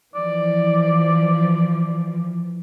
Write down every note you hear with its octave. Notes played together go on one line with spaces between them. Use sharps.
E3 F3 D5